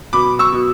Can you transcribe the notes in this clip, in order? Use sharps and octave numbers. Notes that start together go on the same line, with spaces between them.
B2 B5 D6
C#6 E6
B2